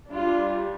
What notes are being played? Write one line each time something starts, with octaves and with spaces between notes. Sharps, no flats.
G3 D4 F4